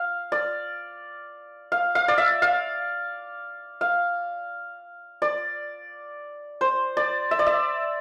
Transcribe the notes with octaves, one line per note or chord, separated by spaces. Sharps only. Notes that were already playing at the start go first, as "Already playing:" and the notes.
Already playing: F5
D5
F5
F5
D5
E5
F5
F5
D5
C5
D5
E5
D5
E5